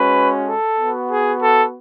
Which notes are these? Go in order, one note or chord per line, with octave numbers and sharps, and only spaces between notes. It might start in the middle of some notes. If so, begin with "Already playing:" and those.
Already playing: G#3 C#4 F#4 B4
A4
B3 F#4
G#4
A4